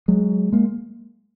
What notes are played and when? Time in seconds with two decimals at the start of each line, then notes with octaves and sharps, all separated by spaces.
0.08 F#3 G#3
0.52 G#3 A#3